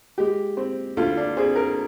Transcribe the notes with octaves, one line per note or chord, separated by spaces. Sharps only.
G#3 G4
C4
D2 F4
D4
C4 G#4
A#4